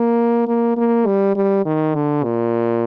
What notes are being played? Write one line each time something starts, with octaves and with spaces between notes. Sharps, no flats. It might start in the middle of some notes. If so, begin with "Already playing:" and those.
Already playing: A#3
A#3
A#3
G3
G3
D#3
D3
A#2